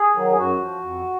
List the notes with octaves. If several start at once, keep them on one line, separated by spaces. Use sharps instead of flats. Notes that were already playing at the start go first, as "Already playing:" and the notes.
Already playing: G#4
D#3 F#3
G#4
F#2 F#4
F3
F2